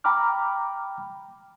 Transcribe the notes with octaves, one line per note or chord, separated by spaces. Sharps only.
G5 A#5 B5 D6 F6